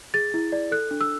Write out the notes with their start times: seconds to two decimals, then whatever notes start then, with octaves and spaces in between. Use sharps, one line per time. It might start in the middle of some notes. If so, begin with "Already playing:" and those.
0.14 G#4 A6
0.34 E4
0.52 D5
0.72 A4 F#6
0.91 D4
1.01 E6